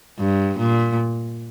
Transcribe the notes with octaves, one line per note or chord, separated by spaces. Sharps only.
G2
A#2